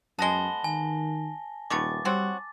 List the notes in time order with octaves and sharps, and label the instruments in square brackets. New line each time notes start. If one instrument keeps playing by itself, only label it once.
[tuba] F#2 [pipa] G#3 B3 [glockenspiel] A5 A#6 G7
[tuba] D#3 [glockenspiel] G#5
[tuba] D#1 [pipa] D#3 A3 B3 [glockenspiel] D6 A6
[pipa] F#3 C4 F#4 [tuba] G3